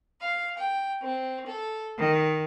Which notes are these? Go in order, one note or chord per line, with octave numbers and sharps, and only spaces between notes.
F5
G5
C4
A4
D#3